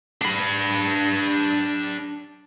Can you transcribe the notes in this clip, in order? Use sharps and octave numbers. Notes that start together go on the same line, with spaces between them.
D4 B5